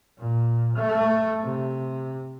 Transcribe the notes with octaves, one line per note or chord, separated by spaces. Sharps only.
A#2
A3
C3